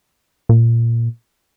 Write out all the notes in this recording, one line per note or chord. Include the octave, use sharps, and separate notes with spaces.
A#2